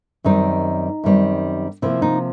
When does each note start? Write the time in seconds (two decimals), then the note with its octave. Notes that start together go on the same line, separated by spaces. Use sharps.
0.24 F#2 D#3 G3 C4 D#4
1.04 F#2 D#3 G3 C4
1.82 C3 F3 A#3 E4
2.02 D#4